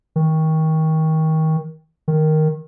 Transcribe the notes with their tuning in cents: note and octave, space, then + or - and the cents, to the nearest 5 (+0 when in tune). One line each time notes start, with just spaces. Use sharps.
D#3 +25
D#3 +0